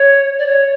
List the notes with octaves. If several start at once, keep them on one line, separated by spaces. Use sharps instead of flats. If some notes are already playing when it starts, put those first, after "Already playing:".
Already playing: C#5
D5
C#5